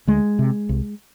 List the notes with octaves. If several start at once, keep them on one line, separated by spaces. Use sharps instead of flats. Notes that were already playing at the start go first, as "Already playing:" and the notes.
D2 G#3
C3
C2